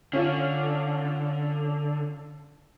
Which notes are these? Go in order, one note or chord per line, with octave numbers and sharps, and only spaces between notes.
D3 C#4 F4